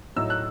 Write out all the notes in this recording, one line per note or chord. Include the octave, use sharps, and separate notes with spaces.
A2 F#3 A3 D#4 E6
F#6